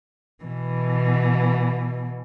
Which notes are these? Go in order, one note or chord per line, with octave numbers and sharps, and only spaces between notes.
B2 E3